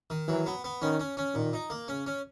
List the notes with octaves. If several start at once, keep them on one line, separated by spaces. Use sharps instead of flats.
D#3
E3 F#3
B3
B3
D#3 C#4
C#4
C#4
A#2 D#3
D#4
A#3
C#3 C#4
C#4